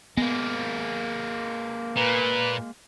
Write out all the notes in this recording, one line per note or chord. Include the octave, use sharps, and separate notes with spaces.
G#3 A#3 B3
A#2 B4